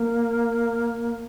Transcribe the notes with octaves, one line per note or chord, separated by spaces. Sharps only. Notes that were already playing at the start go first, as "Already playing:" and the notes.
Already playing: A#3